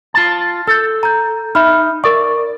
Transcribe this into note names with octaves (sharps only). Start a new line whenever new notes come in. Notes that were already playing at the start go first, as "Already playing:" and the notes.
F4 A5
A4 E6 G6
A#5 G6
D#4 E5 B5 F6
A#4 D5 C#6